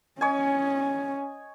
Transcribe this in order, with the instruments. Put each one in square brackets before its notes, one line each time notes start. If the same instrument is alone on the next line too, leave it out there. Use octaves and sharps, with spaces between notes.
[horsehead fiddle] C#4 [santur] C#5 D#5 G#5